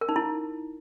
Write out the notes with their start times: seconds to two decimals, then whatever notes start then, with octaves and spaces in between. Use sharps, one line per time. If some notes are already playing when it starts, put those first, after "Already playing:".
0.01 A#4
0.09 D#4
0.16 E4